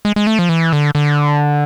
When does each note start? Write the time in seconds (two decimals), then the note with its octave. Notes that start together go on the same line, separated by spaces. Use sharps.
0.05 G#3
0.16 G#3
0.27 A3
0.39 F3
0.49 E3
0.73 D3
0.95 D3